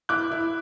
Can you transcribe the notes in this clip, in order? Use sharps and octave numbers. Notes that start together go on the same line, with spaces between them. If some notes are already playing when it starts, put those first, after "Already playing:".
E4 D6 F#6
E4